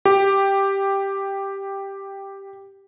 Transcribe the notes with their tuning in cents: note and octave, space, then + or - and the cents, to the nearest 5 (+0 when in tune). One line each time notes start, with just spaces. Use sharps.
G4 +0